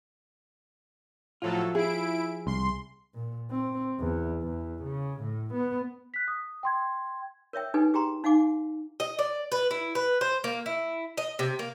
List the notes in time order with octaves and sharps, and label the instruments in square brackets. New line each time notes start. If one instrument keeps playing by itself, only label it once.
[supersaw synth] A2 F#3 A4 [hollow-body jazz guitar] F3 F4
[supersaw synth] E4 D7 [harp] G#4
[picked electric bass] C2 [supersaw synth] C6
[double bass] A#2
C4
E2
E2
C#3
A2
B3
[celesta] F#6 B6
D#6
G5 C6 G#6
[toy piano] A#4 C#5 E5 G5
D4 D#4 G4 A4 B4 G#5
G4 G#4 G5 A#5 C6
D#4 F5 F#5 G#5 D6
[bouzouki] D#5
D5
B4
E4
B4
C5
A#3
E4
D#5
C3
A#3